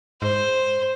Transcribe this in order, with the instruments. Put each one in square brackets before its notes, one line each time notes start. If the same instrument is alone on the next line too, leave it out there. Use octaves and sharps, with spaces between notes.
[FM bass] G#2 [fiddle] C5